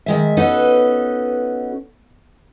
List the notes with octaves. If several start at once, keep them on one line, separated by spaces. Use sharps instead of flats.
D#3 G#3 E5
B3 C#4 D#4 F#4 A4 B4